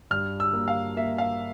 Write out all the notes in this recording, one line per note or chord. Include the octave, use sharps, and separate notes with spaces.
G2 F6
E6
A#3
F5
A#3 E5
F5